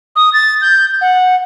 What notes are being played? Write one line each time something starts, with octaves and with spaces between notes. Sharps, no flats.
D#6
A6
G6
F#5